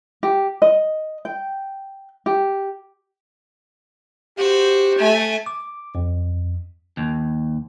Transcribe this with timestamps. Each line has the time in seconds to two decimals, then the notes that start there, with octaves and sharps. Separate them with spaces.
0.23 G4
0.62 D#5
1.25 G5
2.26 G4
4.38 F#4 G4 C5
4.98 A3 G#5
5.46 D6
5.95 F2
6.97 D#2